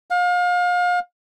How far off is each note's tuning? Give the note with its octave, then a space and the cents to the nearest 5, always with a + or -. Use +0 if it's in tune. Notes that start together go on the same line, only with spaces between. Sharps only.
F5 +35